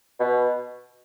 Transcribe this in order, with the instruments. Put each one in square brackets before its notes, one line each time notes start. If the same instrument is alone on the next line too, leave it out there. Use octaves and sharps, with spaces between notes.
[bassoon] B2